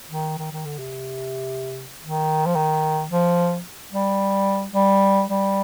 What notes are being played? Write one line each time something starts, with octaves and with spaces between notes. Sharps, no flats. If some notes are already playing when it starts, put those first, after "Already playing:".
D#3
D#3
D#3
D3
C3
D#3
F3
D#3
F3
G3
G3
G3